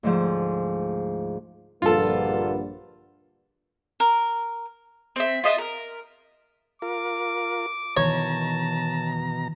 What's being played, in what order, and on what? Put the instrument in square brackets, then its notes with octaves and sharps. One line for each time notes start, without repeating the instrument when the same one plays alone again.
[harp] D2 G#2 F3
[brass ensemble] A#1 G2 [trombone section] D3 A#3 B4 [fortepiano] F4 A4
[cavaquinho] A#4
[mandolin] C4 E5
F4 D#5 E5
A#4
[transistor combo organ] F4 A#4 [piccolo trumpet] D6
[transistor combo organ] B2 A#5 [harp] D#3 E3 [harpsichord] C#5 [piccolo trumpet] A5